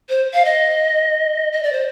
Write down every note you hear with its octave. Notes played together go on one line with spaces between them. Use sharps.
C5
F5
D#5
D#5
D5
C5